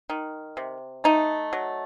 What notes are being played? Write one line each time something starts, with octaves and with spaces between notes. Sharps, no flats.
D#3
C3
A3 D#4
F#3